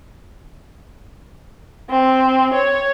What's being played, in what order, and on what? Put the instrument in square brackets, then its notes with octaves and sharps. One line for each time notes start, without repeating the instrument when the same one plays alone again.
[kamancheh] C4
C#5